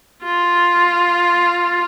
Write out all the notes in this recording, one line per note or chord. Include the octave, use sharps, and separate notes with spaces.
F4